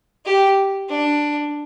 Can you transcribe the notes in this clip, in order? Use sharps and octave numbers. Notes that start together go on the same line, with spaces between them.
G4
D4